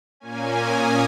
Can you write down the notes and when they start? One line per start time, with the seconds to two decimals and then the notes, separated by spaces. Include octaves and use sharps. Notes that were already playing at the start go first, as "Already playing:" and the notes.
0.20 A#2 A#3 C#4 G#5
0.60 D#6